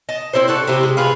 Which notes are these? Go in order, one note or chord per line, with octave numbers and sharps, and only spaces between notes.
D#5 A5
C4 E4 A4 C5
D4 F#4 A4
C3 C4 E4 G4
G#3
F4 G#4 B4 F5